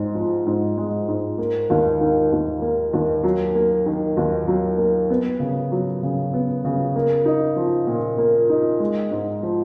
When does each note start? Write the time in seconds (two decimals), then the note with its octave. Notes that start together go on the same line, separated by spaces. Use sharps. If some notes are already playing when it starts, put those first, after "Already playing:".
Already playing: G#2 G#3
0.15 F3
0.46 G#2
0.77 G#3
1.08 G#2
1.38 A#3
1.70 D#2
2.01 D#3
2.32 D#2
2.62 A#3
2.93 D#2
3.23 F#3
3.55 A#3
3.86 D#3
4.17 D#2
4.48 F#3
4.78 A#3
5.10 B3
5.40 C#3
5.72 F#3
6.03 C#3
6.33 B3
6.65 C#3
6.96 A#3
7.25 D#4
7.56 F3
7.87 A#2
8.18 A#3
8.49 D#4
8.80 G#3
9.11 G#2
9.43 F3